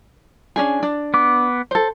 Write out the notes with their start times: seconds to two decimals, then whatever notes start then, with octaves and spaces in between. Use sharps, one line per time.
0.56 C#4 D4 G#4
0.83 D4
1.14 B3 D6
1.71 A4 C5